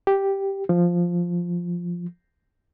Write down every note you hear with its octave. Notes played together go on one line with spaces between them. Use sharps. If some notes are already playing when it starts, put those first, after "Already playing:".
G4
F3